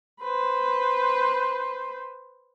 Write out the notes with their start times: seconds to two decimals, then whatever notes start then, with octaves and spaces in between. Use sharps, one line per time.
0.21 B4 C5